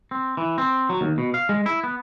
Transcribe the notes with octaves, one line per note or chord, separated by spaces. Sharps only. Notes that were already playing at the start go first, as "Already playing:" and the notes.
C4
E3
C4
F#3
D#2
B2
F5
G#3
E4
B3